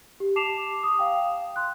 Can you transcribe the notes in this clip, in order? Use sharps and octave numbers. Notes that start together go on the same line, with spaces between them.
G4
A5 D6 C7 E7 F7
D#6
F5 G5
C6 F#6